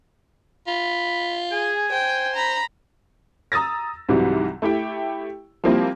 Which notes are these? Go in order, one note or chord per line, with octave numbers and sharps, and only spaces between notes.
F4 B5
G#4 G#5
C5 G5
A#5 B5
A#5 D#6 E6 A6 A#6
C2 G#2 C3 E3 F#3 G3
A3 E4 G4 G5
F3 G3 A#3 C4 E4 F4